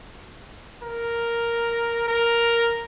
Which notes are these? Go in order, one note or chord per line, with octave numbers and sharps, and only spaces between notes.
A#4
A#4